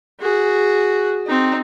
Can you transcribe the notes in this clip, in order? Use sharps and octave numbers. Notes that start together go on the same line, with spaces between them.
F#4 G#4
C4 D#4